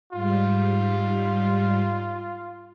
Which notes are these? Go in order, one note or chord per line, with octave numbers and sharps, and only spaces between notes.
G#2 G3 F4